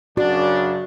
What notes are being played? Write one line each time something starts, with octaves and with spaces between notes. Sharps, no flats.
F#2 C#3 D4 F#4 D5